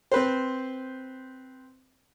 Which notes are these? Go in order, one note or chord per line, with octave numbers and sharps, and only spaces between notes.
C4 B4 C5